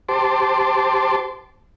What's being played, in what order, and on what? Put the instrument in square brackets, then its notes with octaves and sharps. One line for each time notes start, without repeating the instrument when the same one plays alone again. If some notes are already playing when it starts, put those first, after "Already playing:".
[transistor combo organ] G4 C5 A5 C6 D6